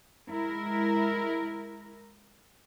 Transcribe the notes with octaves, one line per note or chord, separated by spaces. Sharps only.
G#3 E4 A#4